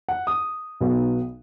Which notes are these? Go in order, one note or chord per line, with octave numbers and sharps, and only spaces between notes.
F#5
D#6
B1 B2 F#3 B3 D#4